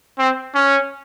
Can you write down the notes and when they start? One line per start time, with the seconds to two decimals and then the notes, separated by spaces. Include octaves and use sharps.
0.19 C4
0.55 C#4